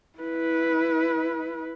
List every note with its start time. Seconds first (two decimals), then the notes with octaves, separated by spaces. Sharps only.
0.19 E4 B4